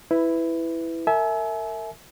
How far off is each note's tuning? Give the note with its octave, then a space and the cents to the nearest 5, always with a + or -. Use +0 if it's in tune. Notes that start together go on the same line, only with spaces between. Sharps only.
E4 +0 B4 +15
A#4 -35 E5 -10 G#5 +35